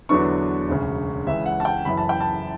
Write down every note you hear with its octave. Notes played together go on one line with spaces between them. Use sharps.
E2 D3 F#3 B3 D4 C#6
E1 D2 C#3
C#2 C#3 E3 E5
F#5
A5
G5
F#1 F#2 E3 B5
A5
G5
A5